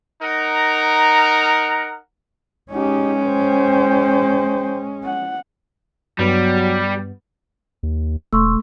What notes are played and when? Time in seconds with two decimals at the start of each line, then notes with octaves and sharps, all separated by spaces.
0.23 D#4 A#4 F#5 A#5
2.72 G#3 C#4 D#4 G4
3.23 C5 G5
5.04 F#5
6.19 G2 F#3 G3 B3
7.83 D#2
8.33 E1 A3 C6 C#6 E6